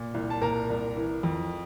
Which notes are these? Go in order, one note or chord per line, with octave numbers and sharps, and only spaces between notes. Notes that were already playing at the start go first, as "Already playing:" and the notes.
Already playing: A#2
C2
A5
A#2 A#4 A#5
C2
E3
F2